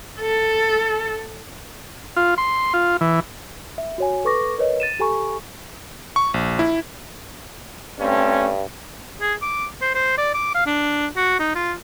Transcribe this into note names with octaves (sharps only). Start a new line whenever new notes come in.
A4
F4
C6
F4
E3
E5
F#4 C#5 G#5
A4 B4 C#6 D6 A#6
A#4 B4 C#5 D#5
A6 D#7 E7
G4 A4 G#5 A#5 C#6
C#6
A#1
E4
G2 A3 C4 C#4
G#4
D6
C5
C5
D5
D6
F5
D4
F#4
D#4
F4